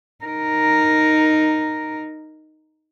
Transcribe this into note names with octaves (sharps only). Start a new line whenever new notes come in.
D#4 A#4